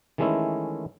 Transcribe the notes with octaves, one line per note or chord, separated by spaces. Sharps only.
D#3 E3 G#3 A3 C#4 E4